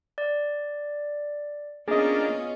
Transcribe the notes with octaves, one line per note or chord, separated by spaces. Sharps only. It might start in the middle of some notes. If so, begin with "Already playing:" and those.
D5
A#3 B3 C#4 D4 F4 G#4 D#5